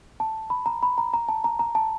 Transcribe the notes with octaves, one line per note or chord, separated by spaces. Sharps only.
A5
B5
A#5
B5
A#5
A#5
A5
A#5
A#5
A5